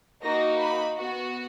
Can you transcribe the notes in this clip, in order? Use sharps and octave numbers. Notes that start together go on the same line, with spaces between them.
A#3 D#4 F#4 A#6
B5
B3 F#4